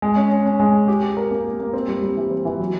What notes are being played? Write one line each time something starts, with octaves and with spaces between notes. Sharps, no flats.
G#3
C#4
C#4
C#4
G#3
G#4
G4
G4
A#4
A#3
G4
A#3
C4
G3
G3
E3
C4
E3
F#3